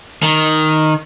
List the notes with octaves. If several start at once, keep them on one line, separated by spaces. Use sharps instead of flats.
D#3